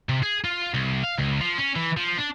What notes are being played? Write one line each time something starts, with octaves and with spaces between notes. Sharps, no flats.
C3
G#4
F4
C2
F5
C#2
F3
C#4
E3
F3
D4